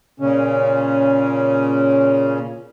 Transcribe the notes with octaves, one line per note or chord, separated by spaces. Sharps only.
A#2 C#3 C#4